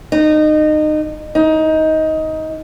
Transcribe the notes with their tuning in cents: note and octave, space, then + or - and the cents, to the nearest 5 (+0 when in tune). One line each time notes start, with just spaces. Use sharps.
D#4 -25
D#4 +15